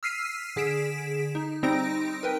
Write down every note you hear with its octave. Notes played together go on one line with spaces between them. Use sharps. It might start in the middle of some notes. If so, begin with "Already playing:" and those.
E6 F6 B6 C7 D#7
D3 G#4 B6 D7 E7
D#4
G3 C4 D#4 A#6 D7
A#4 B4 G5